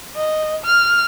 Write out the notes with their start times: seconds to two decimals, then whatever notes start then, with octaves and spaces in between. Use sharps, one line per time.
0.16 D#5
0.65 F6